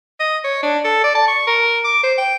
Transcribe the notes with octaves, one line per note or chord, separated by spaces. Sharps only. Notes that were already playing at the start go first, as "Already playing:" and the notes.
D#5
C#5
D4
A4
D5
A5
C#6
A#4
D6
C5
G5